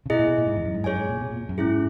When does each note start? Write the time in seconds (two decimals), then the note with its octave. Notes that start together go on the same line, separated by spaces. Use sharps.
0.06 C#3
0.10 B2 E4 G#4 D#5
0.19 A#2
0.28 B2
0.38 A#2
0.47 G#2
0.56 E2
0.65 F#2
0.74 G#2
0.84 F#2 G#4 C#5 G#5
0.96 G#2
1.09 A#2
1.21 B2
1.30 A#2
1.49 F#2
1.58 G#2 C#4 E4 G#4